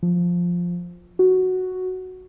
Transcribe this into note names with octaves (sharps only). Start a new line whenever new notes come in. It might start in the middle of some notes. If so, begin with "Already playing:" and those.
F3
F#4